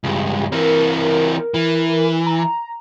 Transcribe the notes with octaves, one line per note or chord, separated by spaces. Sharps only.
C#2 G2
E3 C4 A#4
E3
A#5